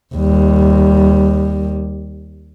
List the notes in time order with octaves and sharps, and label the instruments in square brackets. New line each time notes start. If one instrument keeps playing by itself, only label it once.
[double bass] D#2 G3